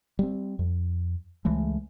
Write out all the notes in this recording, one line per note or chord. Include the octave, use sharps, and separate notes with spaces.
G3 A3 C4
F2
C#2 E3 G#3 A3